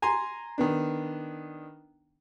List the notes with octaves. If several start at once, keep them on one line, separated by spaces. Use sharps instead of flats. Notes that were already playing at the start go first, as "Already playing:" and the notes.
G#5 A#5 C6
D#3 B3 D4